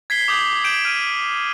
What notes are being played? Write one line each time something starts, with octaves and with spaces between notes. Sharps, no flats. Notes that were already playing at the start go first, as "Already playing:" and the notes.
G#6 B6 C7 G7
D6 D#6 G6
D6
G6 D7 E7 F#7
F6 D7 D#7